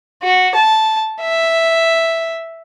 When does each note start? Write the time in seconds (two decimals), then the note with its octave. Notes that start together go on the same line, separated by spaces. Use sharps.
0.23 F#4
0.55 A5
1.21 E5